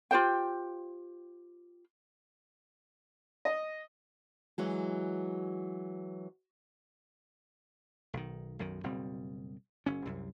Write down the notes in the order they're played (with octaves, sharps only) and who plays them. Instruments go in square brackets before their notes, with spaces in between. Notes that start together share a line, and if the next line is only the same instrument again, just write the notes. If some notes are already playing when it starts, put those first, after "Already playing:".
[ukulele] F4 G4 C5 G5
[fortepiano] D#5
[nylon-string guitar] E3 F#3 G#3
[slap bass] B1 D#3
B1 F#2 D#3
F#1 B2 G3 C4
F#1 C#4
C2 F#2